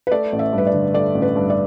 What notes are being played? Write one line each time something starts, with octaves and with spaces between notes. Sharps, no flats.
B4
A3 D5
A1
E5
G2
B4
D5
D3
A3 D5
A1
B4
G2
D5